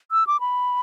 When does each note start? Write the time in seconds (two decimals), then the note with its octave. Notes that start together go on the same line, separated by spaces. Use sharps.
0.12 E6
0.27 D6
0.40 B5